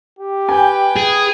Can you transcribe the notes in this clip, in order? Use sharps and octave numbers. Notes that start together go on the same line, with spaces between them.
G4
B4 G5 G#5
G#4